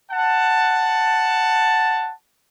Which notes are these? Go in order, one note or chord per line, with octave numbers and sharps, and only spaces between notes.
F#5 A5